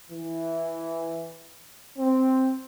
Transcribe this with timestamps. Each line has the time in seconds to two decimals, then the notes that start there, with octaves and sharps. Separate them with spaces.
0.10 E3
1.97 C4